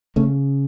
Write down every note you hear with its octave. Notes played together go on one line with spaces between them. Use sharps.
C#3 A3 C#4